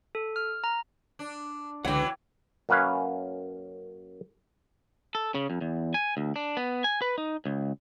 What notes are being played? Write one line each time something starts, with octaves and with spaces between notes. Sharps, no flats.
A4
F6
A#5
D4
C#2 B2 D3 E3 F#3 F#5 G5
F#2 A#3 C#4 B4 F5
A4
C#3
F2
E2
G#5
D2
D4
B3
G#5
B4
D#4
C#2